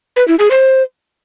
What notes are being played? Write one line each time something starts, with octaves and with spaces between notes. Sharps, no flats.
B4
E4
G#4
C5